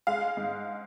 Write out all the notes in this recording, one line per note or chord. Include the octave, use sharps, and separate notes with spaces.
G#3 F5
G#2